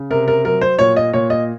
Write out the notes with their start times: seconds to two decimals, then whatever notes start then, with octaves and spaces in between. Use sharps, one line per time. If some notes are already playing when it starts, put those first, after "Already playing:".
Already playing: C#3
0.10 C3 A#4
0.28 A#4
0.44 F#3 A#4
0.61 C5
0.79 A#2 C#5
0.96 D#5
1.13 A#2 C#5
1.30 D#5